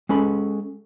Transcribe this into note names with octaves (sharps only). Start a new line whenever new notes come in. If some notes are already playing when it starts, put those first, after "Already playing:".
G#3 C#4 A4 B5